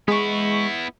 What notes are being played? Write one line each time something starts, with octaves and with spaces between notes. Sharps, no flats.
G#3 B3 E4 C#6